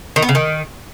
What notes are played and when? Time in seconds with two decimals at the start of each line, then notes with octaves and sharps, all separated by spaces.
0.16 D#3
0.22 B3
0.29 C#3
0.35 D#3